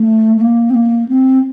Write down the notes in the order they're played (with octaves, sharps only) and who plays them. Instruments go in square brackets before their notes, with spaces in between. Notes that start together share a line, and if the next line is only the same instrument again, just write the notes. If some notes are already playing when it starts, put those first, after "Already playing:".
Already playing: [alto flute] A3
A3
A#3
C4
A#3
C4